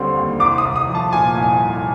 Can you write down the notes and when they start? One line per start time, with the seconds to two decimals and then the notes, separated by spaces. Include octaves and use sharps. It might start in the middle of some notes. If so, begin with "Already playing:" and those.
Already playing: D#2 D3 G3 C4 C6
0.16 D#2
0.39 C2 D6
0.58 D#6
0.65 C2
0.76 D#6
0.88 F3
0.95 A5
1.13 A#2 G#5
1.36 C2
1.60 C2